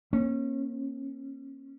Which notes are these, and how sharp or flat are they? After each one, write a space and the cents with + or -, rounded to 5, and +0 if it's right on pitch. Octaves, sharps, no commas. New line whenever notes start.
A#3 +15 C#4 -25